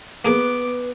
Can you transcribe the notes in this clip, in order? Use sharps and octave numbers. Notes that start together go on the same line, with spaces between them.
A#3 B3 G#4 A#4 B4 D6